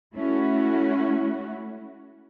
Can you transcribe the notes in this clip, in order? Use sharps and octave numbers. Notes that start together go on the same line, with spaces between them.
A3 C#4 E4 F#4